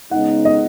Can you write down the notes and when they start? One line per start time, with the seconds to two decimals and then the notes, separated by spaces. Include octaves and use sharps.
0.11 C#3 G#3 B3 D#4 F#5
0.45 D#5